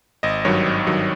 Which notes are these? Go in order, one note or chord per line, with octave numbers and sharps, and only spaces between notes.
G#1 D#5
G2 D#3 F#3 C#5
G#1
G2 D#3 F#3